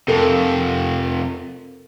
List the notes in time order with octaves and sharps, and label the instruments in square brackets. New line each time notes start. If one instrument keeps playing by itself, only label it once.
[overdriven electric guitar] F2 C3 [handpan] A4 A#4